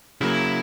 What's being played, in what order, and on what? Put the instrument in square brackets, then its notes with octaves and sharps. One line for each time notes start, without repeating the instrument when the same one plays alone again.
[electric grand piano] C#3 F#3 A#3 [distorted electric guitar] E4